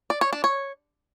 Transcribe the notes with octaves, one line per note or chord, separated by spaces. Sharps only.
D5
C#5
D4
C#5